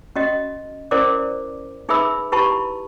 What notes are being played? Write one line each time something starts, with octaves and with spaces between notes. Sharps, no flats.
C#4 F#4 D#5
C#4 E4 A#4 C5 D5 D6
D#4 G#4 B4 E5 B5 E6
E4 G4 B4 A5 B5 C#6